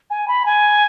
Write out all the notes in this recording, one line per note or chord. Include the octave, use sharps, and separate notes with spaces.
G#5
B5
G#5